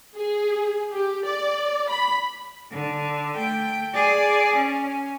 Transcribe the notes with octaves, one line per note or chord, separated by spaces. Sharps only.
G#4
G4
D5
B5
D3
A3 G5
G#4 D5
C#4